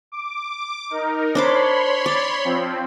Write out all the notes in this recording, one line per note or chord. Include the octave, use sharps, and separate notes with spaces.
D6
D#4 A#4
D4 C5 C#5 B5 C6 D6
D5
F3 C4